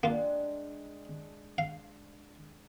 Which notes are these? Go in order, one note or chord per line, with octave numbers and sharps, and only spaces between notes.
G#3 A#3 D4 F4 G5
F5